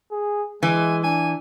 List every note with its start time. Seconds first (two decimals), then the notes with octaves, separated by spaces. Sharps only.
0.12 G#4
0.63 E3 G#3 G#5
1.04 D4 G#5